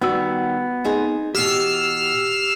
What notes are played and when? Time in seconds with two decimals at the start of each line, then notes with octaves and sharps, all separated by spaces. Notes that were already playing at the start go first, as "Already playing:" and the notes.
0.01 D#3 G3 B3 F#4 E6
0.84 C4 D#4 G#4
1.35 B2 E3 G4 E6 F6 C7